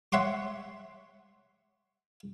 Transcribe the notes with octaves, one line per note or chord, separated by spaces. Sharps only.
C#5 E5 F#5 C6 D6